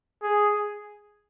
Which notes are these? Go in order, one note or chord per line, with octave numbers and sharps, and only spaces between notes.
G#4